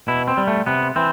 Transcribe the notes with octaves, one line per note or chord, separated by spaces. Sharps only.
B2 E4
C4
G3
A3
C3 B3
E3 C4